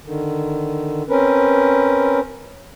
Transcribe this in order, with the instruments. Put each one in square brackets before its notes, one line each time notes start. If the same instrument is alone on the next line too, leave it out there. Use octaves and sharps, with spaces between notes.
[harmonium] D3 D#3
C4 C#4 A#4 B4